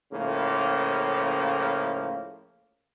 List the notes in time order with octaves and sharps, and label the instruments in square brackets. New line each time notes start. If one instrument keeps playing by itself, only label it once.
[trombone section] A2 C#3 F3 A#3